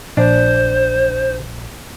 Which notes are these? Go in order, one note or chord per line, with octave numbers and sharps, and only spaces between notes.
A#1 D4 C5